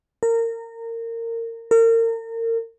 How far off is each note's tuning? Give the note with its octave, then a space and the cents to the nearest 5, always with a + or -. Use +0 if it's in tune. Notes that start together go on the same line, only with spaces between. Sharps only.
A#4 -25
A#4 -35